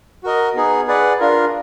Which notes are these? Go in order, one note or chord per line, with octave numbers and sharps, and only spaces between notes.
F#4 A#4 D#5
B3 D#4 G#4
G#4 B4 D5 F#5
D4 F4 A#4